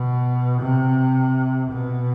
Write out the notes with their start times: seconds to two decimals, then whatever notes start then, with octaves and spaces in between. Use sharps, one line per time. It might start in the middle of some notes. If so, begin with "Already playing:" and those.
Already playing: B2
0.61 C3
1.72 B2